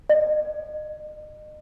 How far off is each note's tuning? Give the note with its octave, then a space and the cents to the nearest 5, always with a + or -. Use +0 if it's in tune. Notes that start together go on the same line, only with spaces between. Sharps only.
D#5 -35